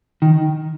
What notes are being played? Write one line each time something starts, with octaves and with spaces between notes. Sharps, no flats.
D#3